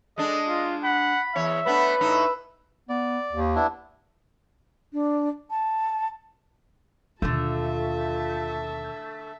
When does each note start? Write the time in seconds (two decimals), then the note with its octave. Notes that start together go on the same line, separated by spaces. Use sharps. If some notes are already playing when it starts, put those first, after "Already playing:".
0.18 G#3 D4 A4 D#5
0.48 F4
0.84 F#5 B5
1.35 E2 C#5 E5
1.66 A3 B3 D4 B4 B5
2.01 A2 D#4 E6
2.89 B3 D5
3.32 D#2
3.55 B3 D4 E4
4.93 D4
5.50 A5
7.22 D#2 B2 D3 A3 F4 E5 A5